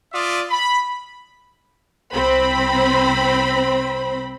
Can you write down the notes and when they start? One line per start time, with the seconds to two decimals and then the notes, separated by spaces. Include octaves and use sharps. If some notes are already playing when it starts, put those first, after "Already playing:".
0.13 F4 D5 E5 D#6
0.50 B5
2.14 C2 C4 C5 B5